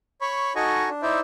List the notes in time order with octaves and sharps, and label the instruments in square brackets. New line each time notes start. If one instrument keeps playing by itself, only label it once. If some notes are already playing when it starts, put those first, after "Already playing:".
[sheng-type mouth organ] C#5 B5 C#6
D#4 F#4 A4 D#5 G#5 C#6
D4
D#4 E4 C5 D5 E5